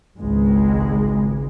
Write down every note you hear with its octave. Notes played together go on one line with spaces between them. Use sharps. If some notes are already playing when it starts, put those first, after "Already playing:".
G#1 C#2 G#3